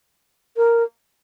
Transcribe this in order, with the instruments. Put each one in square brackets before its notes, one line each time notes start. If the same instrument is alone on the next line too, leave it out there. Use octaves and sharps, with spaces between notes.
[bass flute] A#4